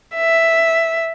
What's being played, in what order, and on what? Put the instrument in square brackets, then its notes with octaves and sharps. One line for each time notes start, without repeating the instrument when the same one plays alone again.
[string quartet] E5